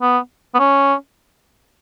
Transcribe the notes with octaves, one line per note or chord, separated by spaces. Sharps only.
B3
B3
C#4